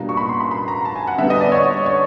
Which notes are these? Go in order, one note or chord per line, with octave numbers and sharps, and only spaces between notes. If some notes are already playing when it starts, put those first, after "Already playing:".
Already playing: B2 G3 A#3 D4 F4 A#5
C#6
B5
C6
B5
B5
A#5
A5
G#5
F#5
D3 G3 B3 E5
D#5
D5
C#5
C#5